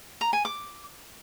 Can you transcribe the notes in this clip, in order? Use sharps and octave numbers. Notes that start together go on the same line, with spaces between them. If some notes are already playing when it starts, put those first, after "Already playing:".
A#5
G#5
D6